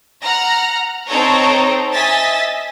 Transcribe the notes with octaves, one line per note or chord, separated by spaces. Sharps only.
F#5 A#5 F6 A#6
C4 D#4 A4 C#5 A#5
D#5 E5 G#5 A6 B6